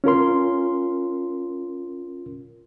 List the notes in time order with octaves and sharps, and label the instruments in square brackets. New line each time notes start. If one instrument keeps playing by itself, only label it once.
[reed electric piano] C#4 F4 A#4 C6